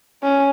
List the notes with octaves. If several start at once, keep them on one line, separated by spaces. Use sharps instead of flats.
C#4